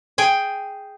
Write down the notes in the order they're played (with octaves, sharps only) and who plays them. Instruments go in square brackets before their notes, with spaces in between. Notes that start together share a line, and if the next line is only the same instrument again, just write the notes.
[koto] G#4 G5 G#5